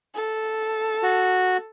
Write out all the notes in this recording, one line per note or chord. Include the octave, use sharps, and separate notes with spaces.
A4
F#4